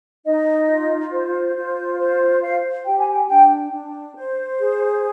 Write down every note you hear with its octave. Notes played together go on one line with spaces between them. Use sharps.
D#4 D#5
F4
C5
F4
C5
C5 F5
G4 G5
G#5
G5
D4 G5
D4
C5
G#4